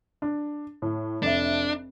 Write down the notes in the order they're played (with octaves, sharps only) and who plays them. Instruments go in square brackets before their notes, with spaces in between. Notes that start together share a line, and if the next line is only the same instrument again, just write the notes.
[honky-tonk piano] D4
A2
[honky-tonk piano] F1 E5 [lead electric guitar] D4